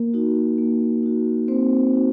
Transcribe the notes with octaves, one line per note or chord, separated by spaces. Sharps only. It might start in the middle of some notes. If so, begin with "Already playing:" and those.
Already playing: A#3 A#4
D#4 F#4
A#3
D#4 F#4
A#3 C4 C5
D#4 F#4